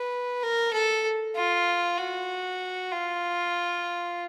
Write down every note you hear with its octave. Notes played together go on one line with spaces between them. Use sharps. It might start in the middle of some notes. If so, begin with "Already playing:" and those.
Already playing: B4
A#4
A4
F4
F#4
F4